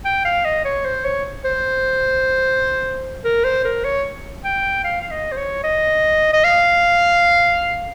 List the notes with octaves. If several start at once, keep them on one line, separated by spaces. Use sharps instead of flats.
G5
F5
D#5
C#5
C5
C#5
C5
A#4
C5
A#4
C#5
G5
F5
F5
D#5
C5
C#5
D#5
D#5
F5